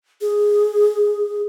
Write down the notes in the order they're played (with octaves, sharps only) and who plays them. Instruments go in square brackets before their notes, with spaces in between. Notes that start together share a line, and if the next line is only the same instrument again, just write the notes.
[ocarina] G#4